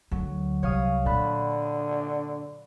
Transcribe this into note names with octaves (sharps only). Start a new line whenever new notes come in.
D2 F#3
C2 C#5 F5 D#6
A#2 D3 A5 B5 F#6